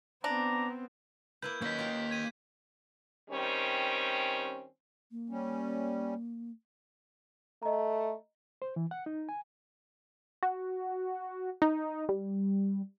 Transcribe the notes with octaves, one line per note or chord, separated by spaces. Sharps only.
B3 C4 D4 A#5
A#3 E4 B4 G6
F#3 A#3 C#4 D#4 D#5 G6 B6
F4 G4
G6 G#6 D#7
D#3 G3 C4 C#4
A#3
G3 C#4
A3 D#5 A#5
C5
E3
F#5
D#4
G#5
F#4
D#4
G3